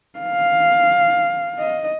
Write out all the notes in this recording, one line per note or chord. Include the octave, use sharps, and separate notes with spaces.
F5
D#5